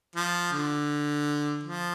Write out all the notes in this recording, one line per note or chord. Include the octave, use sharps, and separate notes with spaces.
F3
D3
F3